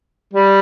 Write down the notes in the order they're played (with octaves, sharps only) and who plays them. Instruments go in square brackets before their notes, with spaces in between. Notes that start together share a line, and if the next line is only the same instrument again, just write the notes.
[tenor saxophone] G3